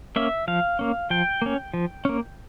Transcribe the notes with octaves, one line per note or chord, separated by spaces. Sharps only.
A#3 C#4 E5
F3 F5
A#3 C#4
F3 G5
A#3 C#4
F3
A#3 C#4